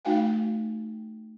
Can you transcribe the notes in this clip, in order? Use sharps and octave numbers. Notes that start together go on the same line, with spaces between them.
A3 D#4 F#4 F5 G5 G#5